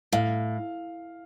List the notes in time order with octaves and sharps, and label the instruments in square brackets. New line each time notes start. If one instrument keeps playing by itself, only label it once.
[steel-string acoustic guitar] A2 [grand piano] F5